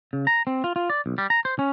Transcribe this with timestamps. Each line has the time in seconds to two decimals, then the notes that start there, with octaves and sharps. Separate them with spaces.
0.13 C#3
0.27 A#5
0.47 C4
0.64 F4
0.76 F4
0.90 D5
1.06 B1
1.18 G3
1.30 A#5
1.45 C5
1.59 C#4